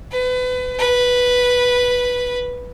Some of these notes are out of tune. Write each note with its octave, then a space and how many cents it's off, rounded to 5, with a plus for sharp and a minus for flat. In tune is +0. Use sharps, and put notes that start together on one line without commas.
B4 +30
B4 -5